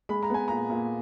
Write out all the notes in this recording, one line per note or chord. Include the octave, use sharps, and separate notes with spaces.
G#3 B5
A#5
B3 G#5
A#2 A#5
A#2